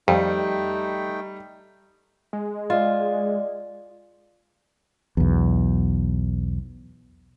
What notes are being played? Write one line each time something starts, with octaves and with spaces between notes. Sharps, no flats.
F2 G3 A3 D#4 G5
G#3
F4 D5 D#5
B1 E2